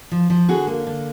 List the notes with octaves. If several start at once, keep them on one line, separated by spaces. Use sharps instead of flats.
F3
F3
D3 F#4 G#4
A#3
D3